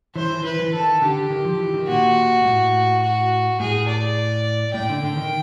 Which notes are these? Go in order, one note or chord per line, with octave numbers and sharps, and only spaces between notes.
E3 C5
E3
E3 B4
E3
D#3 A4
D3 G4
D#3
F3
E3
D#3
A#2 F#4
A2
F#4
A2 G#4
D5
A2 G5
D3
D3
D#3